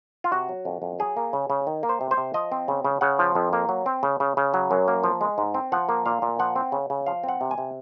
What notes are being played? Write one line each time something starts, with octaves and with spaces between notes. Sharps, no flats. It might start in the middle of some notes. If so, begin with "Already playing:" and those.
F4
C3 F#4
F#3
F2
F2
F#3 G#4
A#3
C#3
C#3
D#3
A#3
C5
C3
C5
C3
F3 D#5
C4
C#3
C#3
C#3 F#5
F3
F2
A#3
F#3
C4
C#3
C#3
C#3
F#3
F#2
A#3
F3
G#3
G#2
C4
F3 F#5
A#3
A#2 F5
A#2
F3 F#5
C4
C#3
C#3
F3 F5
C4 F#5
C3
G#5
C3